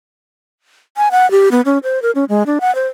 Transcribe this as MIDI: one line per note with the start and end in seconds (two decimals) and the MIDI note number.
0.97 1.09 80
1.11 1.29 78
1.31 1.49 67
1.51 1.61 59
1.65 1.78 61
1.83 2.02 72
2.02 2.11 70
2.15 2.24 61
2.29 2.43 56
2.46 2.59 62
2.61 2.73 78
2.75 2.87 72